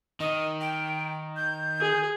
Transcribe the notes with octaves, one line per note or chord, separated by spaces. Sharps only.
D#3 D#5
G5
G6
G#4